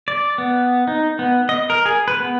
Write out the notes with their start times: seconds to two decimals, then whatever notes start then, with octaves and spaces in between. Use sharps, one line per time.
0.08 D5
0.38 B3
0.87 D#4
1.19 B3
1.49 D#5
1.70 A#4
1.86 G#4
2.08 B4
2.20 B3